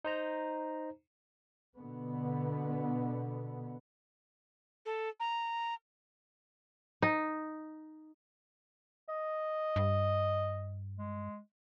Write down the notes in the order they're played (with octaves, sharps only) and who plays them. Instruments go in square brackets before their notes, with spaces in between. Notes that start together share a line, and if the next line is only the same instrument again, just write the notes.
[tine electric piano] D#4 C5 A#5
[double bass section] B2 D3 B3
[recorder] A4
A#5
[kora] D#4
[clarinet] D#5
[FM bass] G2
[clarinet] G#3